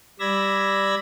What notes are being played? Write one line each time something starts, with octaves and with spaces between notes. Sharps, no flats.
G3 D5 B5 E6 G#6 A#6